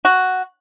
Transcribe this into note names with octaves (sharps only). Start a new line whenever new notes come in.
F#4